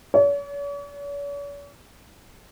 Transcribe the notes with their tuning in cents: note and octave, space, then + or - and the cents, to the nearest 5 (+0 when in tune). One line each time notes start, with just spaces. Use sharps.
C#5 +45